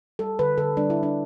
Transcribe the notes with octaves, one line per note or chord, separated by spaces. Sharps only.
G3 A4
D3 B4
D3 A4
G3 D4
E4
G3
D4